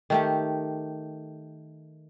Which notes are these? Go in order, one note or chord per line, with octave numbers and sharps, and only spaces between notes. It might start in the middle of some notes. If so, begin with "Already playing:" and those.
D#3 A3 G4